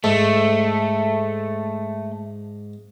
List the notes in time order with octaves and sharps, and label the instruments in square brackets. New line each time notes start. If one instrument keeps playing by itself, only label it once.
[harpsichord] G#2 [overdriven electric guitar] A3